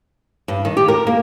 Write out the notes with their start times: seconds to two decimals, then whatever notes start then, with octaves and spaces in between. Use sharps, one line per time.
0.48 G2
0.65 D#3
0.77 G4
0.88 A#4
1.07 A#3